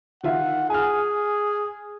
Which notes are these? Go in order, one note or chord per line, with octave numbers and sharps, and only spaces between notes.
D#3 F4 E5 F#5
G#4 G#5 F6